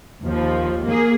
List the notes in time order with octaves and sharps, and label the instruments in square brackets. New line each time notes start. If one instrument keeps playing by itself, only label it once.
[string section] D#2 F3
A#3 G#4